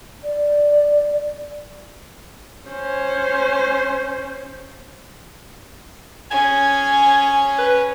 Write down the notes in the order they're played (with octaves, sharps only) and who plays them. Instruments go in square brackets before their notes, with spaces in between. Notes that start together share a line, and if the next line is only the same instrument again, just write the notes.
[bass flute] D5
[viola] C#4 C5
[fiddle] C#4 G#4 [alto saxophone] G#5
[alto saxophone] B4